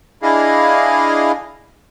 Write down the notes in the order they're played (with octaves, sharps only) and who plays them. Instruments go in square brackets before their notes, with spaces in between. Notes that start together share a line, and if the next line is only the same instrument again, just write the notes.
[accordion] D4 E4 G#4 D#5 F5